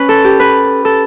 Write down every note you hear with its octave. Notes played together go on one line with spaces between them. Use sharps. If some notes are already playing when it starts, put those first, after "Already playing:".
Already playing: C#4 B4
A4
G4
B4
A4